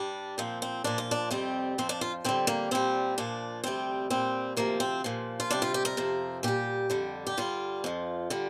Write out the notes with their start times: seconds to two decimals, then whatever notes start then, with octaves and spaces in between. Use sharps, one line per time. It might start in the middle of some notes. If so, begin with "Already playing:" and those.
Already playing: G2 G3 D4
0.38 A#2 F3 C4
0.62 C4
0.84 A#2 F3 D4
0.98 F4
1.11 D4
1.31 F2 C3 G3 C4
1.78 F2 F3 C4
1.89 D4
2.01 F4
2.24 F2 D3 G3 C4
2.47 A#3
2.71 A#2 G3 C4
3.18 A#2 F3 D4
3.64 D2 C3 G3 C4
4.10 A#2 G3 C4
4.57 D2 C3 F3 A#3
4.80 C4
5.04 A#2 F3
5.40 F4
5.50 F2 C3 G3 D4
5.62 F4
5.74 G4
5.85 A#4
5.97 F2 C3 F3
6.43 A#2 G3 G4
6.90 F2 D3 G3
7.27 G4
7.37 G2 D3 G3 F4
7.84 F2 F3
8.30 D3 G3